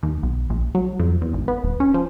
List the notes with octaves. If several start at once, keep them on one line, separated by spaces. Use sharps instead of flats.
D#2
B1
A#1
F#3
F2
E2
G#1
B3
D#1
C#4
F3